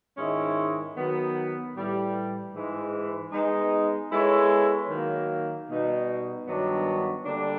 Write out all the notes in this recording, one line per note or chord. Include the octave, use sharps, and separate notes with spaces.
G#2 D#3 G#3 C#4 E4
D#3 F#3 B3
A2 E3 G3
G#2 E3 G#3
G#3 B3 D#4
G#3 B3 E4 A4 C#5
D#3 F#3 A#3
B2 G3 B3 D#4
G2 D#3 F#3 B3 D4
D3 G3 A#3 D4